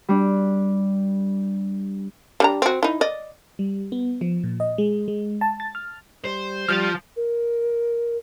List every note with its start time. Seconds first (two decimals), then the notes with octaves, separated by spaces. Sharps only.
0.09 G3 D4
2.40 G3 D4 A#5
2.62 C4 F#4
2.83 D#4 E4
3.01 D5 D#5
3.59 G3
3.92 B3
4.21 F3
4.44 A#2
4.60 D#5
4.78 G#3
5.08 G#3
5.41 A5
5.60 A6
5.75 F6
6.24 G3 C5
6.69 F3 G3 F6 G6 A6
7.16 A#4